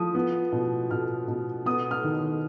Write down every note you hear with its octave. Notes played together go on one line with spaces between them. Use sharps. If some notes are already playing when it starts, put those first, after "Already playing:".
Already playing: F3 D#6
B3
B2
B2 F6
B2
B3 D#6
F6
D#3